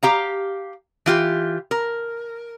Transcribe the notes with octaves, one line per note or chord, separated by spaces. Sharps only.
G4 F5 A#5
E3 F4 G4
A#4